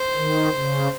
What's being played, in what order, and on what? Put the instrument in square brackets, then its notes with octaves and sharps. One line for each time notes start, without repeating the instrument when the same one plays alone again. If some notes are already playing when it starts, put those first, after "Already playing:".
Already playing: [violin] C5
[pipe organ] D#3
C#3